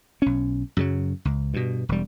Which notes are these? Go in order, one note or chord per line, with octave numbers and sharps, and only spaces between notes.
B1 C#4
F#2 C#3 F#3
C#2
G2 B2
E1 G3